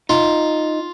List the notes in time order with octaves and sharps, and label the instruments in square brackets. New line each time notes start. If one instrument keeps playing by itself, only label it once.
[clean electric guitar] D#4 [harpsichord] F4